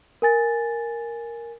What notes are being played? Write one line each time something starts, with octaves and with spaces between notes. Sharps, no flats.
A#4 G#5 A6